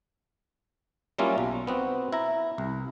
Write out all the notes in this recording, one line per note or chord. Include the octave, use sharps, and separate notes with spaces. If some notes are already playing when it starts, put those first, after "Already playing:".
F#3 G3 A#3 C#4 E4 F4
B1
B3 C4 F#4
E4 A#5
C2